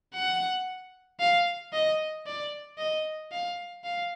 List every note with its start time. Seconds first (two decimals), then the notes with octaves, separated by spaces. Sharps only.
0.14 F#5
1.20 F5
1.73 D#5
2.26 D5
2.78 D#5
3.32 F5
3.84 F5